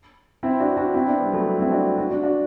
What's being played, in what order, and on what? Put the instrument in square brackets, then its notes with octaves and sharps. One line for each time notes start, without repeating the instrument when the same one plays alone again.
[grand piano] C4 E4
D4 F#4
D4 F#4
C4 E4
B3 D4
G3 B3
F#3 A3
F#3
C4 E4
D4 F#4
D4 F#4
D4 F#4
D4 F#4